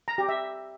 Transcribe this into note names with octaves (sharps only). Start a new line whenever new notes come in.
A#5
G4
E5